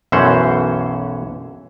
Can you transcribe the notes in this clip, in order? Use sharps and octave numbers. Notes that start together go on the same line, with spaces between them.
B1 F#2 E3 C#4 C5 F#5